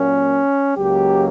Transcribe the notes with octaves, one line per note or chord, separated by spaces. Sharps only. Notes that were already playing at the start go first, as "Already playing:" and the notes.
Already playing: A#2 F#3 A#3 C#4
C#2 C#3 F#3 A#3 G4